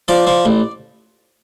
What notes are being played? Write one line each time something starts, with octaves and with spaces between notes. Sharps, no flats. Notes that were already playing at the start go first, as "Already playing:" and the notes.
F3 D5
F3
A1